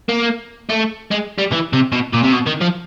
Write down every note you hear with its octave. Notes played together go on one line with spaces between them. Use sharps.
A#3
A3
G#3
G3
E3
C3
B2
A#2
C3
B2
D#3
F3